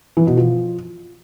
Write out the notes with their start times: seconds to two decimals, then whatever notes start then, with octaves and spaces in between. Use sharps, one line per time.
0.17 E3
0.27 B2
0.37 F3